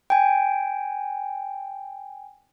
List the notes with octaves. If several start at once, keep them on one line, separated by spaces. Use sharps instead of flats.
G5 G#5